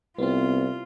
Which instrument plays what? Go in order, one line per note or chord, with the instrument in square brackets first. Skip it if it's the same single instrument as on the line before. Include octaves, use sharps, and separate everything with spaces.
[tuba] C2 [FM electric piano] B3 C4 [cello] F4